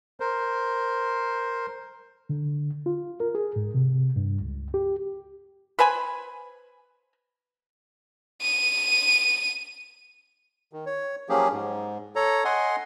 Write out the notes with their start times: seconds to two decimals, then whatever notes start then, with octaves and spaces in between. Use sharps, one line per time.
0.20 A#4 C5
2.29 D3
2.86 F4
3.20 A#4
3.35 G#4
3.56 G#2
3.74 C3
4.16 G2
4.40 C#2
4.74 G4
5.79 B4 C5 G#5 B5
8.42 D#7
10.73 D#3
10.86 C#5
11.29 F3 F#3 A#3 C#4 G4 G#4
11.53 G#2
12.16 A4 C#5 A#5
12.45 D#5 F#5 G#5 C6